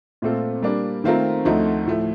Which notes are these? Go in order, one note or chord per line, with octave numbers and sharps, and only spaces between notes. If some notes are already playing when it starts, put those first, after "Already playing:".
A#2 A3 C4 F4 A4
G3 A#3 D4
D#3 A3 C4 F4 A#4
D2 D3 F3 A3 D#4
A2 F3 A3